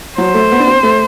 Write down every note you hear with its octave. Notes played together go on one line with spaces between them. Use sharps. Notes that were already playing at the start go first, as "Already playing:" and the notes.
F#3 C5
A3
B3
D4
C4
A3